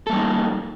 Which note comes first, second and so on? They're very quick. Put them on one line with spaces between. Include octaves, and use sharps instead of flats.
A4 A#3 G3 D#4